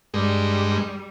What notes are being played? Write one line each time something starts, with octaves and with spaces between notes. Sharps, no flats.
G2 G3 G#3